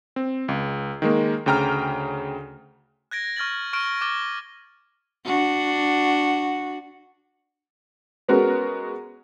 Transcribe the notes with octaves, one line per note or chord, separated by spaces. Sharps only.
C4
C#2
D#3 G#3 A#3
D2 C#3 G5 A#5 F6
F#6 G#6 A#6 D7
C#6 F6 G#6 A6 F#7
C#6 F6 F#6 D7 E7 G7
D6 F#6 A6 G7
D4 F#4
G#3 B3 C#4 F#4 A#4